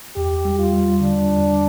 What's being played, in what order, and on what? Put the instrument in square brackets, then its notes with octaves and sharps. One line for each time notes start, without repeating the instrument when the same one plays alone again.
[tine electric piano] E2 [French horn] G4
[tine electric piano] G3
[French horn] F4
[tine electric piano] G3
[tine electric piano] D3 [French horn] D4
[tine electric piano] E2